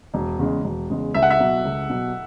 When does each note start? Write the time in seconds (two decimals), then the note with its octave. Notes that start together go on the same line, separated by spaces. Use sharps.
0.14 E1
0.39 E2 C#3 G#3
0.64 E1
0.90 E2 C#3 G#3
1.14 C#2 E5
1.23 F#5
1.30 E5
1.40 B2 F#3
1.65 C#2
1.89 B2 F#3